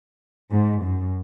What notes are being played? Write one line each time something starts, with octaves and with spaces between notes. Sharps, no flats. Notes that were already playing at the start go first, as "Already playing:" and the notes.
G#2
F#2